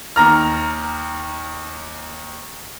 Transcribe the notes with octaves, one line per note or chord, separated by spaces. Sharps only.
D#2 A#5 F6